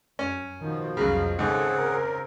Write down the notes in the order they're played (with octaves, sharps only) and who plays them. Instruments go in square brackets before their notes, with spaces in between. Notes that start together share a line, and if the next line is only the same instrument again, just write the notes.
[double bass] F#2 [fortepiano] C#4
[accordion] B2 F3 [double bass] D#3
[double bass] C2 F2 [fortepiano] C#3 F#3 [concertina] F5 A#5 B5
[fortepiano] D#2 G#2 [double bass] C#3 C4 [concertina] G#4 F#5 [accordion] A4
[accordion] A#4